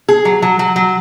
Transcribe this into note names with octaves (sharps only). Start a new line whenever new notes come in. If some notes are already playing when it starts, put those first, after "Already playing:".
G#4
F#3
F#3
F#3
F#3